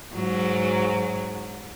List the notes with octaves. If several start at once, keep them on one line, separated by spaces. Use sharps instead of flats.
G#2 F#3